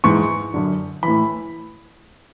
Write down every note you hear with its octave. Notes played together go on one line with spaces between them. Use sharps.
G#2 E3 C#6
F#2 D3
A2 E3 B5